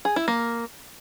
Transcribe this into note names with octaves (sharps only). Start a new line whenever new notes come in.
G#4
E4
A#3